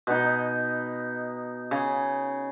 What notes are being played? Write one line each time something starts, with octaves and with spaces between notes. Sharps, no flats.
B2 D#4
C#3